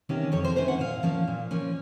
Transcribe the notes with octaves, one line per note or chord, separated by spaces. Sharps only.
C3 D#3 A#3 C#4
F2 C#5
C5
C3 D#3 A#3 C#4 C5
F#5
A#2 F5
F3 A#3 C#4
A#2
F3 A#3 C#4